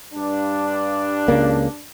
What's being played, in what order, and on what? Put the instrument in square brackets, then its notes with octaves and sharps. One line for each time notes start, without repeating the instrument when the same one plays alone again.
[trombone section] G2 D4
[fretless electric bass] C#2 C#3 A#3